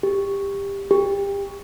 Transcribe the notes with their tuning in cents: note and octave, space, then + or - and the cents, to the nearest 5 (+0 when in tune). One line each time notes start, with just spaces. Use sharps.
G4 +20
G4 +30